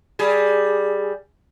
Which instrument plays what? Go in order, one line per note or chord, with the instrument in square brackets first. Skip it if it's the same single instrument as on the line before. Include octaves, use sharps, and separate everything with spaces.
[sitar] G3 G#4